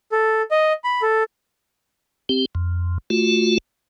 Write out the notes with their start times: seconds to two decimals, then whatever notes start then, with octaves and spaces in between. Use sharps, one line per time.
0.12 A4
0.51 D#5
0.84 B5
1.02 A4
2.29 C4 G4
2.55 F2
3.10 A3 F4 F#4